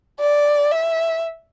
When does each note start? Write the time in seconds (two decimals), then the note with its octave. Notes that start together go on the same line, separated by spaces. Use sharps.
0.19 D5
0.71 E5